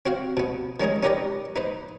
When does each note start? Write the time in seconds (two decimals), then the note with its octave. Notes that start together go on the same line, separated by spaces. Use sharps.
0.06 C4 F#4 C5 F5
0.37 B2 B3
0.80 D#3 G#3 C#4 D#4 G#4
1.03 C#4 D#4 G4 A#4 B4 D5
1.56 D#4 B4 C5